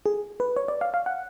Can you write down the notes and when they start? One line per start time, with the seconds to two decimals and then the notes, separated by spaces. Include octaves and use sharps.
0.06 G#4
0.40 B4
0.56 C#5
0.68 D5
0.81 F5
0.94 F5
1.06 F#5